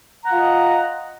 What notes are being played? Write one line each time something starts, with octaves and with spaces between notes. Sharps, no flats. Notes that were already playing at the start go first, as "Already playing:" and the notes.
F4 D#5 F#5 A#5